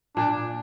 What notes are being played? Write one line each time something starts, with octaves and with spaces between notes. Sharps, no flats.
A#2 D4